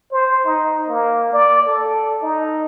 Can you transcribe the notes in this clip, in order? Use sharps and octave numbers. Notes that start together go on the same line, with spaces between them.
C5
D#4
A#3
D5
A4
D#4